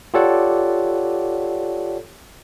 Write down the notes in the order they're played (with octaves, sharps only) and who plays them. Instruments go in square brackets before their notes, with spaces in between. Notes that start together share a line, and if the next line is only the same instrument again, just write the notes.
[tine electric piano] F4 G4 A4 C#5 D5 F#5